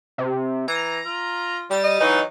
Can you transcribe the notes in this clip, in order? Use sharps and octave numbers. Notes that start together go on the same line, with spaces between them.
C3
E3 A#5
F4
G3 A6
D#5
E3 F#3 D#4